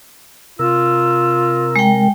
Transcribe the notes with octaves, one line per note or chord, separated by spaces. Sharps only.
C3 F4 A#4 E6
G#3 G5